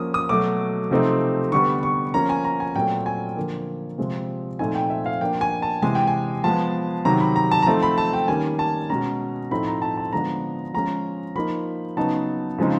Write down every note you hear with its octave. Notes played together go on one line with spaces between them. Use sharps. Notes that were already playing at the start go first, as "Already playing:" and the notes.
Already playing: F3 A#3 C#4 D#6
D#6
B2 F#3 A3 D6
C3 F3 A3 C4 D#4
D3 G3 B3 C#6
C#6
F3 A#3 C#4 A#5
G#5
A#5
G#5
A#2 F#3 A3 C4 G5
G#5
D3 F3 A#3
C3 F3 G#3 C4
A#2 F3 A3 C4 D#4 G#5
G5
E5
F5
F3 A#3 D4 G5
G#5
A5
C3 E3 G#3 G#5
G5
G#5
F3 G#3 B3 A5
C3 D#3 F#3 A#5
B5
A#5
A5
A#5
F3 A3 C4 D#4 A5
B5
A5
G5
D#3 G3 A#3 C#4 G#5
A5
B2 G#3 C#4 A#5
A2 F3 A3 C4 D#4 B5
A#5
A5
A5
D3 F3 G#3 B3 D4 A#5
F3 G#3 C#4 A#5
F3 A#3 D#4 B5
C#3 F#3 B3 D#4 A5
C#3 F3 G#3 C4 D#4